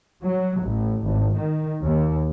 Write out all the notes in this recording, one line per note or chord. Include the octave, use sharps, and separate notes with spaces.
F#3
A1
G#1
D#3
D#2